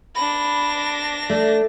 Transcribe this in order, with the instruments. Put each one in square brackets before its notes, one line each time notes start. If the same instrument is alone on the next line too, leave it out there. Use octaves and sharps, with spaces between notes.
[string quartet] D4 A#6 [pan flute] B5
[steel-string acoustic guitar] A3 [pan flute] D5